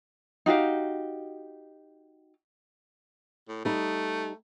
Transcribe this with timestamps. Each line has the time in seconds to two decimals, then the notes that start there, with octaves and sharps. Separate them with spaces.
0.46 D#4 F#4 G4 F5
3.48 A2
3.65 G3 A3 D#4